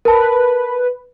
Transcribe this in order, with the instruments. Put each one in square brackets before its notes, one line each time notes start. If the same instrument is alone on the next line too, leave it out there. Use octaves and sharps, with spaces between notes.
[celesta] A#4 A5 [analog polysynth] B4